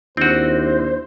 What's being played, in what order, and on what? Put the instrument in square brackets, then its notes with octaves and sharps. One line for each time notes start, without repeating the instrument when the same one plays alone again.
[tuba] D#2 [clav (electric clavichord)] C4 F#4 [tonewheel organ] D4 E4 [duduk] C5